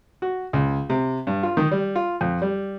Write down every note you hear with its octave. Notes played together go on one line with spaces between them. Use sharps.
F#4
C#2
C3
G2
F4
D#3
G3
F4
F2
G3